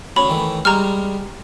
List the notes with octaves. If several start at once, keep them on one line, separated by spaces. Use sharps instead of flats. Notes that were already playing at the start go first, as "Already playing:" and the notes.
D2 C#4 C#5 B5
D#3 E3 A3
G3 G#3 A#5 C#6 F6